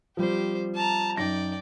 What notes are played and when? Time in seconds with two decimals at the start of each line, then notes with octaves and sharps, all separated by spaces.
0.17 F3 G3 C4 G4 C5
0.75 A5 A#5
1.17 F#2 D#4 D5 G5 A#6